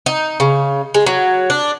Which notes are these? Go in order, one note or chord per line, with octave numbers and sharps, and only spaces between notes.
D#4
C#3
G#3
F#3
D4